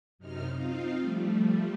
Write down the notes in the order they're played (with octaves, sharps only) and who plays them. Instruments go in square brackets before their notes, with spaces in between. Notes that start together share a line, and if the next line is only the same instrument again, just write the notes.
[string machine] F#2 C3 D#4 F6
C4 D#4 F4 F5
F3 G3 A3